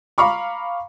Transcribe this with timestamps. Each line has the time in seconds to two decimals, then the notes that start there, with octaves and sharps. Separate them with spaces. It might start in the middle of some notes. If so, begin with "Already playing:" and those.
0.18 F5 A#5 B5 C#6 D6